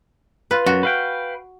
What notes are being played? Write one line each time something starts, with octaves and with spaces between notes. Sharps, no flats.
F4 B4
F#2 F#4
B4 F5 G5